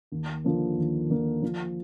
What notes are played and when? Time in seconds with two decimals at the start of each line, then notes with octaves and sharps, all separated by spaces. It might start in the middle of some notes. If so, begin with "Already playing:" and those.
0.12 D#2
0.44 D3 F3 A#3
0.77 D#2
1.09 D3 F3 A#3
1.43 F3